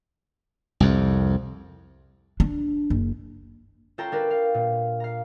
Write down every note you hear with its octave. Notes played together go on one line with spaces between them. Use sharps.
C2 F2
D4
F#1
C#4 F4 A4 G5 A5 A#5
D4 A#4 B4
F5
A#2
F5 A#5